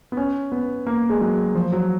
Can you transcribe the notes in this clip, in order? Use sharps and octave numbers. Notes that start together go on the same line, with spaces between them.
B3
C#4
B3
A#3
G#3
F#3
F3
F#3